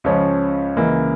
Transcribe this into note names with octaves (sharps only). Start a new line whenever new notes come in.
C#2 C#3 F3 C#4
C#2 C#3 E3 A#3